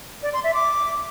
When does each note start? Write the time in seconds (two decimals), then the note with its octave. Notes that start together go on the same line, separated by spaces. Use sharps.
0.23 D5
0.33 C6
0.44 E5
0.54 D6